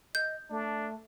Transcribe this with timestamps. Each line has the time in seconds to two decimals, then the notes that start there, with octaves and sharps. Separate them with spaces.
0.15 D#5 G6
0.50 A3 D4